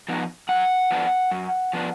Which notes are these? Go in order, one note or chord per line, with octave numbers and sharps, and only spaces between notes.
F3 B3 D#4
F#2 F#5
F3 B3 D4
F#2
F3 B3 D4